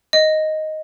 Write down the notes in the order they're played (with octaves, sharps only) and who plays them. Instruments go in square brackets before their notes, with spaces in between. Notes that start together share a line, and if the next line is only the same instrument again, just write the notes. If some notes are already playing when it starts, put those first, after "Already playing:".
[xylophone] D#5